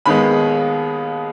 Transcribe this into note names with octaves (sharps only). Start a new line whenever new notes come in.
D#2 D#3 G#3 B3 B5